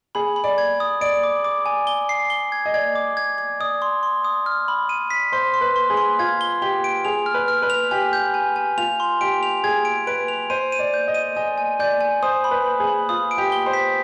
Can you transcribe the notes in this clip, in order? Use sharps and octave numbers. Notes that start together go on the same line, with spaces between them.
G#4 B5
B5
D5
G#6
D#6
D5 D7
D6
D6
G#5
G7
C7
G7
G#6
D#5
D5 G#6
D6
G#6
G#6
D5 D#6
C6
C6
D#6
F6
B5
D#7
B6
C5 C6
C6
B4
C6
G#4
C6
F4 G#6
G7
G4 G7
D7
G#4 F7
F6
B4
F6
B4
F7
G4 G#5
G6
G#5
G#5
F4 F7
C6
G4 D7
F7
G#4 G#6
D7
B4 D7
F7
C5 D#7
D#7
D5
G6
D#5
D#7
D#5 G#5
G#5
D5 G6
G#5
C5 D#6
B5
B4
B5
G#4
B5
F4 D#6
D7
G4
G7
C5
B6